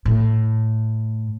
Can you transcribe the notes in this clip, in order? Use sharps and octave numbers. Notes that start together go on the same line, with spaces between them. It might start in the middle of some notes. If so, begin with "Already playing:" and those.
A2